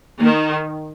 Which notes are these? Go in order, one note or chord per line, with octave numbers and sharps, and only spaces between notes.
D#3 A#3